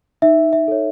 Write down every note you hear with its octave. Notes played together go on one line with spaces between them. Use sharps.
D#4 E5
E5
A4 C#5